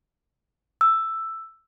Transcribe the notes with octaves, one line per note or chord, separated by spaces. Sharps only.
E6